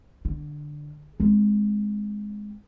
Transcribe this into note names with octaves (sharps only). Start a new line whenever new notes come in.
D3
G#3 C4